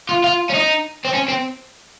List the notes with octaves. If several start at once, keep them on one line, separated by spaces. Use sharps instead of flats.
F4
F4
C#4
D#4
C4
C#4
C4